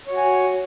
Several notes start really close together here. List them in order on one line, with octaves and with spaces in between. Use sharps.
C#5 F#4 G#5